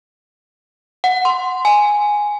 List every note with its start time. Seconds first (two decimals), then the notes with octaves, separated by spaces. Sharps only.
1.04 F#5
1.25 C6
1.65 G#5